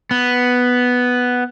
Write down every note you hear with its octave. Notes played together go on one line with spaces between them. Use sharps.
B3